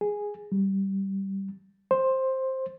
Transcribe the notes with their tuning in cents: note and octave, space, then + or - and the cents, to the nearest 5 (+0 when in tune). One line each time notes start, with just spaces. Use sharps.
G#4 -5
G3 -10
C5 +10